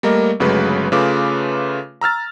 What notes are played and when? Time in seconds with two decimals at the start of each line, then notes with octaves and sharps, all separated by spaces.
0.03 G3 A3 A#3 A#4 D#5
0.40 G1 C#3 F#3 G#3 A3 B4
0.92 C#3 A3 F4 B4 D6
2.01 A#5 E6 F6 A6